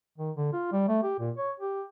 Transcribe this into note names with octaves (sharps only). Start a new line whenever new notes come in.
D#3
D3
F4
G3
A3
G4
A#2
C#5
G4